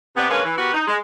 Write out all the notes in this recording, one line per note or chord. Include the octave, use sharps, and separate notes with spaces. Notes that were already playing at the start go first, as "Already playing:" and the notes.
C3 B3 D5
D3 G#3 A#3 C#4 B4 C#5
E3
B3 F#4 G4 A#4 B4
D#4
G#3